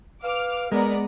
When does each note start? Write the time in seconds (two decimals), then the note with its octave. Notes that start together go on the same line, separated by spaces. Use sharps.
0.23 B4 F5 D6 F6
0.72 G#3 B3 G#4 A#4 D5 A#5